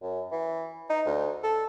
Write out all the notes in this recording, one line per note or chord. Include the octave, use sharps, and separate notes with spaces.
F#2
E3
D#4
D2
A4